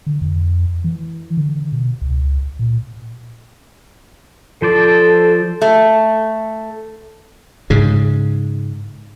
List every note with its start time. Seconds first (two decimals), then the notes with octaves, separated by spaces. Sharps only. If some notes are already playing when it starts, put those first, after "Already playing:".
0.07 D3
0.22 F2
0.84 E3
1.37 D3
1.72 B2
2.02 C#2
2.59 A#2
4.62 F3 A4 C5 D5
5.62 A3
7.70 G#2 C#3